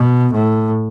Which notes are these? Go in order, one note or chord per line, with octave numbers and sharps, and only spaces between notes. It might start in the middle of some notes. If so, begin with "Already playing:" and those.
Already playing: B2
A2